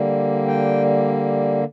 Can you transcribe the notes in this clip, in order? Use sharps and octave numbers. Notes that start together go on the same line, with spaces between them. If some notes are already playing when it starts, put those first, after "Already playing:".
Already playing: D3 G3 A#3
G5